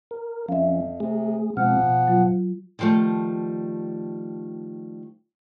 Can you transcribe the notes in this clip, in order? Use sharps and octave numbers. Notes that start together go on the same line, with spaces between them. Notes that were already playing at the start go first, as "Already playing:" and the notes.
A#4
F2 F3 C#4 E5 F5
C3 A3 G#4
B2 F3 G#3 C4 F#5 F6
B2
F#3 F4
D3 D#3 F3 G3 A3